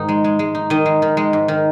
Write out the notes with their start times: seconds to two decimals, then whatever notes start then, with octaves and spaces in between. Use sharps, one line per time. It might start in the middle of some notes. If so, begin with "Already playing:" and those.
Already playing: G#2 D#3 D#4
0.09 G#3
0.24 G#3
0.39 G#3
0.55 D#4
0.70 D#3 D#5
0.86 G#3
1.02 D#3
1.17 G#3
1.33 G#2
1.48 D#3